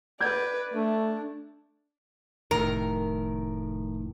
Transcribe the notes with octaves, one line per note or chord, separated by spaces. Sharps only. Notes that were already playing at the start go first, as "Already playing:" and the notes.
B4 D5 G6 G#6
A3 D4
F1 A2 D#3 A#4